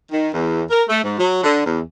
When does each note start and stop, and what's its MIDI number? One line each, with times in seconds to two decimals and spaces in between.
0.12 0.28 51
0.34 0.63 40
0.70 0.82 70
0.88 1.02 57
1.03 1.17 44
1.19 1.43 54
1.43 1.62 50
1.65 1.80 40